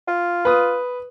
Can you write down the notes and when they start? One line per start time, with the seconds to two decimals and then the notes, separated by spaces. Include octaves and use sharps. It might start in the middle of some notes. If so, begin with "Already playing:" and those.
0.08 F4
0.45 B4 D#6